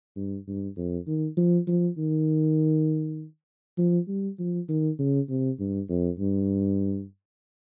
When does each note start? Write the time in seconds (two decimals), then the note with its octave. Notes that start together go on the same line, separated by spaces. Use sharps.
0.16 G2
0.47 G2
0.77 F2
1.07 D#3
1.37 F3
1.68 F3
1.98 D#3
3.78 F3
4.08 G3
4.39 F3
4.69 D#3
4.99 C#3
5.29 C3
5.59 G2
5.89 F2
6.19 G2